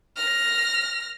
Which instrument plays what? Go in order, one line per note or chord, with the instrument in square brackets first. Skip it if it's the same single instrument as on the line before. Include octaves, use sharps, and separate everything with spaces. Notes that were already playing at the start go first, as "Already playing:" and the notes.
[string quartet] F6 A#6